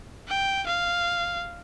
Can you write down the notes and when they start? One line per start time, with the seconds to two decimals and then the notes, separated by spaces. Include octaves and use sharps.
0.27 G5
0.67 F5